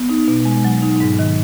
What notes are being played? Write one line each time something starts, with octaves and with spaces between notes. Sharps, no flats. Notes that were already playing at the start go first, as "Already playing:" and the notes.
Already playing: B3
D#4
B2
G#3
F#3
D#4
G#2
D#3